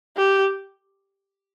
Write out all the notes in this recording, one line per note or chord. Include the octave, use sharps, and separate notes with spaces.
G4